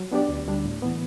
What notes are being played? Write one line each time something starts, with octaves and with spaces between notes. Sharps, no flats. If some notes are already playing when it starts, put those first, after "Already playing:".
Already playing: F#3
B3 D4 G4 D5
D2
D3 G3 D4
A2
E3 B3